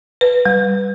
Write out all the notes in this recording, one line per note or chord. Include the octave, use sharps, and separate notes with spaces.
B4
G3